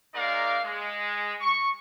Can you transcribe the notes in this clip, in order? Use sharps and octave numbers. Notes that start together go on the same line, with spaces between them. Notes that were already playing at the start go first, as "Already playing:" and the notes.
G#3 A#3 D#4 A#4 D5 F5
G#3
C#6